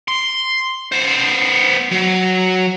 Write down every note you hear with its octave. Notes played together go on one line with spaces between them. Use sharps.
C6
B3 C5
F#3